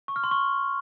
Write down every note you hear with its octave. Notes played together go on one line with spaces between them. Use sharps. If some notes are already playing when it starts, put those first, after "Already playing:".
C#6
F6
C6
C#6